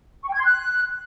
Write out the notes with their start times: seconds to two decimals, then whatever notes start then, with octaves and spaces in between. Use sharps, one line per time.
0.22 C#6
0.28 G5
0.33 G#6
0.39 C6
0.44 F#6